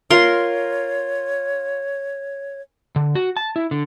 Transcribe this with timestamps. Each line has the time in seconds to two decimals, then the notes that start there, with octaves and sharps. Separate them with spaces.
0.10 F4 A#4 C#5 C6
2.96 D3
3.15 F#4
3.37 A5
3.56 E4
3.71 D3